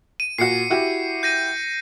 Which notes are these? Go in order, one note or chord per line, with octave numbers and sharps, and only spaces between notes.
D#7
A#2 F#4 C7 C#7
E4 F#4 G4
G6 A#6 D#7